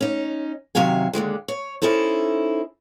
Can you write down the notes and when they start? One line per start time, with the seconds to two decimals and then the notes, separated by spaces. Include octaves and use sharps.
0.01 C#4 D#4
0.75 F#2 C3 D#3 F#3 F5 G#5
1.13 D#2 D3 D#3 G#3
1.48 C#5
1.82 C#4 D#4 E4 A4 C5